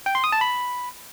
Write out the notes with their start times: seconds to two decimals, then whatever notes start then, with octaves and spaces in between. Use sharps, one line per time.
0.06 G5
0.15 C6
0.24 D#6
0.32 A5
0.41 B5